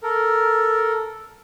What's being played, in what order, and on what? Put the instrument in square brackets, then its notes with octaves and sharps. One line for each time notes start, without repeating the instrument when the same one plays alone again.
[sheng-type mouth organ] A4 A#4